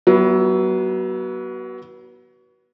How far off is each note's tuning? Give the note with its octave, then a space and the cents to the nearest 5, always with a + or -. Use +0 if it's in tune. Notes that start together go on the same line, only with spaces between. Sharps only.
F#3 +25 B3 -25 E4 -10